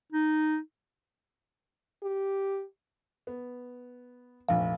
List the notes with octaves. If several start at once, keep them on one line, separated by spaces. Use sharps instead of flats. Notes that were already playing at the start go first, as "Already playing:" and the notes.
D#4
G4
B3
F1 A#1 F5